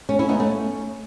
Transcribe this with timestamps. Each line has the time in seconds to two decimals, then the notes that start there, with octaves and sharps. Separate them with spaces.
0.09 A3 C#4
0.19 C#4 E4
0.29 B3 D#4
0.40 A3 C#4